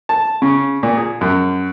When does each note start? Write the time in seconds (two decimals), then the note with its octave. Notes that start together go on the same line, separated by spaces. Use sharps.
0.09 A5
0.42 C#3
0.83 A#2
0.97 G#4
1.21 F#2